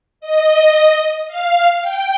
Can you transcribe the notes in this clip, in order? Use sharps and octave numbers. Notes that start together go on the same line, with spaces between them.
D#5
F5
G5